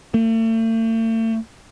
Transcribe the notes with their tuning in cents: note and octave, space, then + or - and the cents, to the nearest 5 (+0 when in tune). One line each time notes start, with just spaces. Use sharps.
A3 +40